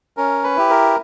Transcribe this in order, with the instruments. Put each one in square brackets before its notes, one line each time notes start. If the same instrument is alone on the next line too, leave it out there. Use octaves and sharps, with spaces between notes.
[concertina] C#4 A#4
B4
E4 G4
A#4